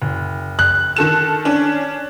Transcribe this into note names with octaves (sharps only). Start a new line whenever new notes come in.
F#1
F#6
D#3 A4 E7
C#4 D4